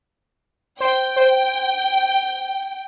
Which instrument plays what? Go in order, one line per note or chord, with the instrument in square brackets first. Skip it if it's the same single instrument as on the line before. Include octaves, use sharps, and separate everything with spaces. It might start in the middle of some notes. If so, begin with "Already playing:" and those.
[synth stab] C5 [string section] G5
[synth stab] C5